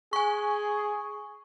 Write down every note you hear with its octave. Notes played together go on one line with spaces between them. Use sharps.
G#4 G#5 C#6